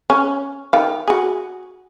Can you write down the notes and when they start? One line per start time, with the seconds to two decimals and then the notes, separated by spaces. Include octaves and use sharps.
0.10 C#4
0.73 D#3 F5
1.08 F#4 G#4